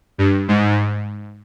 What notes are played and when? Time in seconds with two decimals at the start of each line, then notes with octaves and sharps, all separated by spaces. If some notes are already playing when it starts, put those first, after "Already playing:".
0.18 G2
0.48 G#2